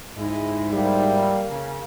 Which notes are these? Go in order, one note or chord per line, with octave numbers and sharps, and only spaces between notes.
D2 G#2 G#3 E4 D#5
F3 G3 A#3 E4 F5
C#3